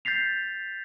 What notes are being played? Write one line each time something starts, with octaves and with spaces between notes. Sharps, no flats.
G6 A6 B6 C7 F7